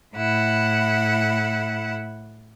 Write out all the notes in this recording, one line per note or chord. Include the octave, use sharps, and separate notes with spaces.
A2 E4 F#5